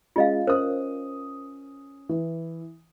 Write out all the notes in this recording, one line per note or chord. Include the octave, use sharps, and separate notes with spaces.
G#3 C#4 F4 D#5 F5
C#4 A#4 C5 D#6
E3